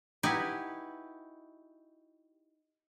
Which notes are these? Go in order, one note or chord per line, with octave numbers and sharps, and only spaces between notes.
D#4 E4 F#4 G4 B4 G#5